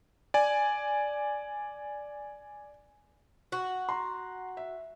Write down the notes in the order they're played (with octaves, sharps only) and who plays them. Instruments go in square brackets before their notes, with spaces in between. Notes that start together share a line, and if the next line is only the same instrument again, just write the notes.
[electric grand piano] D5 G#5
[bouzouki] F#4
[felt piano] A#5 C6
E5